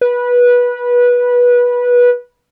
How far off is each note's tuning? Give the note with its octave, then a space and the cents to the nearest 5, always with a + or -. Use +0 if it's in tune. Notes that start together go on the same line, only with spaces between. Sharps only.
B4 -20